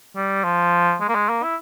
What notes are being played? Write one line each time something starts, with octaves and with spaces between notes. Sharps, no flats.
G3
F3
G#3
A#3
G#3
A#3
E4